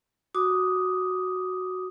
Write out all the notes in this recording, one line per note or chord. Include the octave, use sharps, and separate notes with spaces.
F#4 D6 D#6